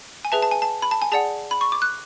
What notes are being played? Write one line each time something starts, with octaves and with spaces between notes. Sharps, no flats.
G#5
G#4 B4 E5 A5
A5
G#5
A5
B5
A5
G#5
G#4 D5 F#5 A5
B5
C#6
D6
F#6